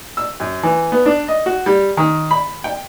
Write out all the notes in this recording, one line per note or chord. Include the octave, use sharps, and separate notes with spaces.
E6
F#2
E3
B3
D4
D#5
F#4
G3
D#3
B5
G5